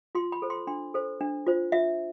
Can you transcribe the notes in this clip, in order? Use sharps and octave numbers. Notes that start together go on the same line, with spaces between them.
F4 C6
B5
A4 C5
C6
D4 C6
A4 C5
D4
F4 C5
F4 E5